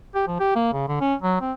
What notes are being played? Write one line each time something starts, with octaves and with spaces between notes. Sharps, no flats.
G4
F3
G4
A#3
C#3
D3
C#4
F#3
C4